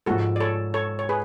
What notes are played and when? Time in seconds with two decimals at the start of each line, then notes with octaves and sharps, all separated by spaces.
0.06 G#2 F3 G#3 F#4 A4
0.36 D5
0.40 A4 C#5
0.74 A4 C#5
0.99 C#5
1.09 G#4 B4